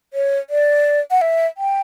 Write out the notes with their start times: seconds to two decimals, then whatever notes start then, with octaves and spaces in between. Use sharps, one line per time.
0.14 C#5
0.50 D5
1.11 F#5
1.21 E5
1.58 G5